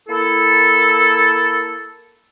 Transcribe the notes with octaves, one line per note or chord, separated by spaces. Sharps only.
A#3 E4 A4